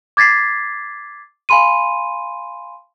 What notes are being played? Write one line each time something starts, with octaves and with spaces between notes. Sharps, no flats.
D6 G#6 A6 B6 C7
F5 G#5 B5 C6 D#7